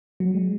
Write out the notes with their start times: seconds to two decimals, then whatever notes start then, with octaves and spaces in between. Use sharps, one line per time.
0.20 F#3
0.34 G#3